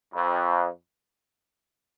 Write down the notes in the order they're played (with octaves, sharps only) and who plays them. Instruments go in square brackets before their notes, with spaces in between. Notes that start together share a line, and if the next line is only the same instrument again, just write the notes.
[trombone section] F2